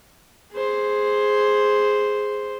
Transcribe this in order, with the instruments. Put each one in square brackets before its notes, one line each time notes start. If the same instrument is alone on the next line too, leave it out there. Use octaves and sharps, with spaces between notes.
[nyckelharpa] G#4 C5